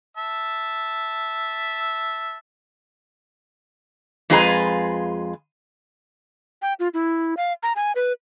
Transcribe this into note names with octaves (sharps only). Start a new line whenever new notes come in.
E5 A5
F2 G#3 F4 G#4 B4 A#5
G5
F4
E4
F5
A#5
G#5
B4